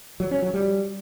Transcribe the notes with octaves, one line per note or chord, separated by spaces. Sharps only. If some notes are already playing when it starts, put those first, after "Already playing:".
F#3
C#4
F#3
G3